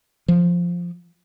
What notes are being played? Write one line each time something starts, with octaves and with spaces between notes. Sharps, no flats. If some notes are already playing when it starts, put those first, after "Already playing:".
F3